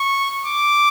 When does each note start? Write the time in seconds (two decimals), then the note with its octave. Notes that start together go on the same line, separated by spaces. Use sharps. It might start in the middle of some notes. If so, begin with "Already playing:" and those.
Already playing: C#6
0.46 D6